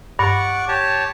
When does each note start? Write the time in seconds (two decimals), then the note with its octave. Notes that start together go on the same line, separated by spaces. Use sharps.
0.19 G2 D5 F#5 C#6
0.68 G4 C#5 A5